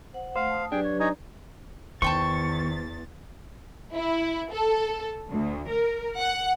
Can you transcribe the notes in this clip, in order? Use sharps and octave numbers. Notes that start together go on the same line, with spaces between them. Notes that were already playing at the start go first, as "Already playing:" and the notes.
C5 F#5
A3 C5 F5 F#5
A5 D#6
F#3 D4 G4 G#4 B4 G5
C#5
D#4 C#5 G#5 A#5
E2 D#3 C5 G5 A5 C#6 A6
E4
A4
D2
A#4
F#5